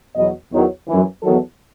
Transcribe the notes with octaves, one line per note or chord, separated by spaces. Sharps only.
E2 B2 F#3 D#5
E2 D#3 F#3 C#5
F#2 E3
E2 D#3 F#3 A4